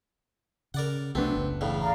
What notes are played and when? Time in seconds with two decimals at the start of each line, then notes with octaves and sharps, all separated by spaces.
0.74 C#3 A#4 D5 F#5
1.15 C2 F#3 A3 B3 C4 D4
1.35 F#1 C#2
1.61 E2 A2 C#3
1.81 D5 F5 A#5